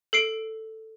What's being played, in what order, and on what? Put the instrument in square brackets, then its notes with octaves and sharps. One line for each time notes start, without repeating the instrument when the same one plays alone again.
[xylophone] A4 C7 D7